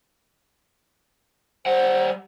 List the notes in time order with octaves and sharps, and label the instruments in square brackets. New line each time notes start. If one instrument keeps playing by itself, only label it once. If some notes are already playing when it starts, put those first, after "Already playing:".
[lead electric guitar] G3 F#5 [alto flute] C5